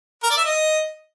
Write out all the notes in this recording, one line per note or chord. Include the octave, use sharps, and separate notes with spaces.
A#4
D5
E5
D#5